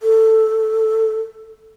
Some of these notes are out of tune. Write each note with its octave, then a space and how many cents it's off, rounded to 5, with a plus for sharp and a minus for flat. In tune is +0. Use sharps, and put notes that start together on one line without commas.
A4 +5